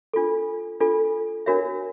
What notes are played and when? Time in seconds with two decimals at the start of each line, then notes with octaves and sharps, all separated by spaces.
0.14 D4 F4 A4
0.80 D4 F4 A4
1.46 D4 F#4 A#4 C#5 E5